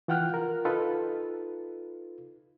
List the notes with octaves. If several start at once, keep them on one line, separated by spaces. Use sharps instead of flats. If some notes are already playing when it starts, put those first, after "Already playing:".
E3 F4 F#5 G5 F6 F#6
F4 A#4
D#4 F4 A4 B4